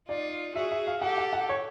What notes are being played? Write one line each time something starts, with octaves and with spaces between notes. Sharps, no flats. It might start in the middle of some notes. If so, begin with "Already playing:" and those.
D#4 F4 D5
F#4 G#4 E5
E5
F5
G4 A4 F#5
F#5
F#5
C#5